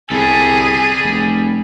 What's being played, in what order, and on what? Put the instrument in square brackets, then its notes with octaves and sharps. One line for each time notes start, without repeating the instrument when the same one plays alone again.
[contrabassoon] C2 [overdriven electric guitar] G3 A4 [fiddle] G#4
[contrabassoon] F1